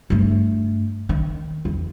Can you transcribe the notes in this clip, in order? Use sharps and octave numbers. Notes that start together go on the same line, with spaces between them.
G2 A3
D#3
E2